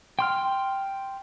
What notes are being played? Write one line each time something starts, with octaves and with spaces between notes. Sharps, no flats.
G5 C6 F6